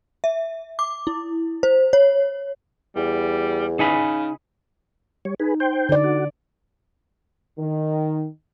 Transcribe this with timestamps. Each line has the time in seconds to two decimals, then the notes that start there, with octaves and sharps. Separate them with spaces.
0.24 E5
0.79 D6
1.07 E4
1.63 C5
1.93 C#5
2.96 E2 G3
3.79 C#3 D#4 G#5 B5
5.25 G3 C#5
5.40 D#4 G#4 B4
5.60 C5 G5
5.89 D3 D5
6.04 F#4
7.58 D#3